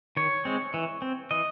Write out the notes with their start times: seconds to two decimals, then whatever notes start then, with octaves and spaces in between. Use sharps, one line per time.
0.17 D#3 C#5
0.45 G#3 C4
0.74 E3
1.02 C4
1.31 E3 D#5